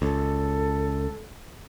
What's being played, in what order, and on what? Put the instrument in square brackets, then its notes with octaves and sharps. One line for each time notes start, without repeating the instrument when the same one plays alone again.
[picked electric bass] C#2 [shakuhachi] A4